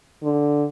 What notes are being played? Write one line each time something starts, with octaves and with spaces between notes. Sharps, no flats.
D3